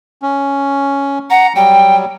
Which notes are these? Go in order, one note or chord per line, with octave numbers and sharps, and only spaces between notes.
C#4
F#5 A#5
F#3 G3 G5